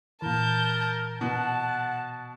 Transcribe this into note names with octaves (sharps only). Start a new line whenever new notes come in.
A#2 E3 A#4 A5 G6
B2 F#5 A5